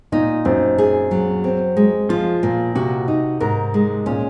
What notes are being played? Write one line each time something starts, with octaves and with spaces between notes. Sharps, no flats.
A#2 D#4
F#2 C4
G#4
F#3
C4
G#3
F3 F4
A#2
C3 F#4
D#4
G#2 A#4
G#3
A#2 C#4